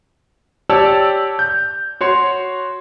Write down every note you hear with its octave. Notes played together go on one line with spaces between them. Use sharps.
G4 C#5 D5 A5 E6
G6
F#4 C#5 C6